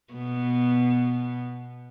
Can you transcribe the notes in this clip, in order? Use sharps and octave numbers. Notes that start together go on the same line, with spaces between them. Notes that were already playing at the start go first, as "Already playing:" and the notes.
B2 B3